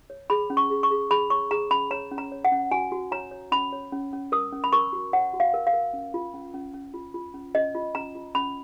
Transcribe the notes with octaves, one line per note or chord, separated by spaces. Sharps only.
C#5
G#4 B5
C#4
C#6
G#4
C#6
G#4
G#4 B5
C#5 C#6
G#4 A#5
C#4 B5
C#5 A#5
C#4
A#5
C#5
F#5
C#4
F#4 G#5
F#4
C#5 A#5
C#5
C#4 B5
C#5
C#4
C#4
A#4 D#6
C#4
B5
A#4 C#6
F#4
C#5 F#5
F#4
F5
A#4
F5
A#4
C#4
F4
C#4
C#4
C#4
F4
F4
C#4
C#4 D#5
F4
C#4 A#5
F4
C#4 B5